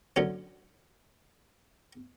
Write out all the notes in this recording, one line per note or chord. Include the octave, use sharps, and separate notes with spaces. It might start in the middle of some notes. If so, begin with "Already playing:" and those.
D3 F#3 C#4